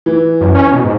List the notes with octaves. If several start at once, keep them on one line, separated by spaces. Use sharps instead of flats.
E3
F#2
C#4
B2
G#2